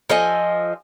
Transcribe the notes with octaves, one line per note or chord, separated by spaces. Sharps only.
F3 A4 D#5 G#5